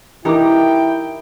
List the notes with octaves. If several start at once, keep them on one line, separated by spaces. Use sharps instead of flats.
E3 D#4 E4 G4 A#4 G5 D6